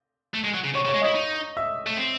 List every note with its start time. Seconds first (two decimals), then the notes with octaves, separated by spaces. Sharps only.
0.34 A3
0.44 G#3
0.55 F#3
0.65 C#3
0.75 C3 C#5 C#6
0.86 C#3
0.88 C#5 C#6
0.95 G#3
1.02 E4 D#5 D#6
1.15 D#4
1.57 E5 E6
1.86 A3
1.97 C4